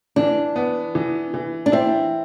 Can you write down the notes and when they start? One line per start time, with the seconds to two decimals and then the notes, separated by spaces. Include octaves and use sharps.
0.16 E3 D4
0.56 B3
0.95 E3
1.34 E3
1.66 D4
1.72 C4 E4